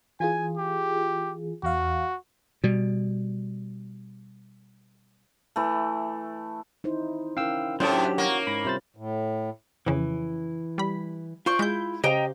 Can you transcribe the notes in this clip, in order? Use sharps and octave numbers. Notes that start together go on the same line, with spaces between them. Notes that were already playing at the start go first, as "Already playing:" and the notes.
E3 F4 G#4 G#5
G4
E2 F#4 F5
B2 G3
E3 A3
D#4 E4 C5
C#4 E4 A#4 F5 G5 E6
A2 F#3 C#4 D4 G4 C5 G5 A5
A#3 F#4 C#5
G#2 B5
C3 G3 F4 C5 A6
A2
F2 C#3 E3
G3 B5
F4 C5 D5 C#6
G#3 E4 G6
C#3 G4 C5 D#5 F5 G5 A#5